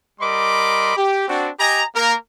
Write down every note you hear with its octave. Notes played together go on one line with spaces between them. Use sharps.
G3 A#4 D#5 B5 C6 D6
G4
C4 D4 F#4
G4 D#5 G#5 A#5
A#3 A#4